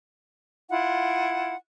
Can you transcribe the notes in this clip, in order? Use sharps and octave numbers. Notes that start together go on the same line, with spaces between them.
E4 F4 F#5